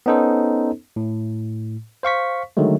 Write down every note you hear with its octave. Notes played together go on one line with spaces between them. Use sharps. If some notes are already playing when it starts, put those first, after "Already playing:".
B3 C#4 D#4 A4 C5
A2
C5 F5 C#6 B6
D3 D#3 F#3 G#3 A3